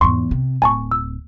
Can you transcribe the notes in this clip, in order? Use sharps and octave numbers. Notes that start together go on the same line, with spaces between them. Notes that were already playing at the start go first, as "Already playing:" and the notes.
E2 G#2 C6 C#6
C3
D1 G#5 A5 C#6
E6